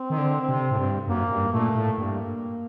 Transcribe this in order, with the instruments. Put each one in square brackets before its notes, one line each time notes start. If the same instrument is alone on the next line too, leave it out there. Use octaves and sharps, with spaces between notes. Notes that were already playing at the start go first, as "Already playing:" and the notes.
Already playing: [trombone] C4
[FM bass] D#3
D3
C3
A2
G2
[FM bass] F#2 [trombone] A#3
[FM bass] G2
[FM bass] A#2 [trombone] A3
[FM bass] A2
[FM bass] G2 [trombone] A#3